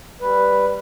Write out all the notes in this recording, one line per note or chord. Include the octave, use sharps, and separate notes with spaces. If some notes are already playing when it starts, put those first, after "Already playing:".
G3 B4